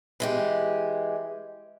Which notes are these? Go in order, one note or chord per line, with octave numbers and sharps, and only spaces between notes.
E3 G#3 G4